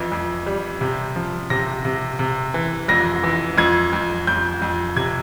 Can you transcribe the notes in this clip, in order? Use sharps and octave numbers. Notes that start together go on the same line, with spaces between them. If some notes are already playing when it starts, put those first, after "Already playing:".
Already playing: F2 E3
F2
G3
C3
F3
C3 A#6
C3
C3
E3
F2 A#6
E3
F2 G#6
F2
F2 G6
F2
C3 G#6